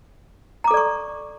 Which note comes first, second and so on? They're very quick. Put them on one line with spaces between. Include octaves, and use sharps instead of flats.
A#5 D6 A4 D5 C#6